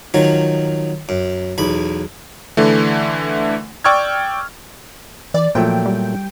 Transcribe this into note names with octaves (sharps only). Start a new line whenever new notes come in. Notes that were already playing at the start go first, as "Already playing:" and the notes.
D#3 F3 F#3
F#2
B1 E2 B5
D3 E3 A3
D5 G5 C#6 E6 F6 G#6
E3 D5
A#2 F3 F#3 A3 G5
G3